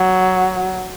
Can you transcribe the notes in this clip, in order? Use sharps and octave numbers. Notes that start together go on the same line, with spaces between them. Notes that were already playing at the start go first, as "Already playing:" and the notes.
Already playing: F#3